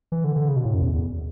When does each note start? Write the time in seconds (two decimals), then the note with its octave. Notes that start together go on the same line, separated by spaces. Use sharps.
0.12 E3
0.24 D3
0.36 D3
0.48 C#3
0.56 B2
0.65 A2
0.74 F#2
0.82 E2
0.94 E2